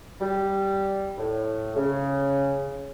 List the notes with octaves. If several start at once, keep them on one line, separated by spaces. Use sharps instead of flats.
G3
A2
C#3